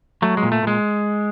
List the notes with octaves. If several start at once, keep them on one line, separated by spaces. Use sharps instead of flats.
F#3 A3
G#3
A#2
A3
A#2 G#3